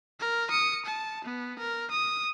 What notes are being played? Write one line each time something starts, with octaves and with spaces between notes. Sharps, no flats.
A#4
D#6 C#7
A5
B3
A#4
D#6